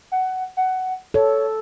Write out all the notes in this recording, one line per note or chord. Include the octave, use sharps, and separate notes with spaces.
F#5
F#5
A4 C#5